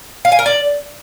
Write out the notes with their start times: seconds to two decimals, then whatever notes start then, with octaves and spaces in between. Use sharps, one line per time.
0.25 F5
0.32 G#5
0.39 A#4
0.46 D5